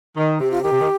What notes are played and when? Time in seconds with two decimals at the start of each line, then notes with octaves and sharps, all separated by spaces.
0.16 D#3
0.40 C3 G4
0.51 F4
0.63 D#3 G4
0.72 C3
0.80 D#3